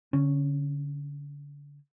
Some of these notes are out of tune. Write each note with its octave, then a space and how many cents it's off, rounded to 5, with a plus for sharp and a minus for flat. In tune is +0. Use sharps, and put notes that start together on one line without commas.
D3 -30 C#4 +0